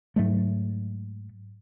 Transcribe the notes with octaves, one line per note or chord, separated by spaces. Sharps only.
G#2 F#3 A3